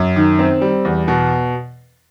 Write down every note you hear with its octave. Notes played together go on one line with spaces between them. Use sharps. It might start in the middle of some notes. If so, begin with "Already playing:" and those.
Already playing: F#2
D#3
C4
G3
E2
B2